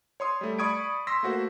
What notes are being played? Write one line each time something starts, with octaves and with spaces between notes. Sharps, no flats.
C#5 C6 D#6
G3 A3
D5 B5 C#6 D#6 G#6 D7
C6 E6 A#6 B6
A3 A#3 F#4 C5